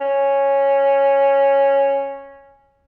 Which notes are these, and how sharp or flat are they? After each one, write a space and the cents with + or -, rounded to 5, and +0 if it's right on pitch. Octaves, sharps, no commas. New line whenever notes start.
C#4 -5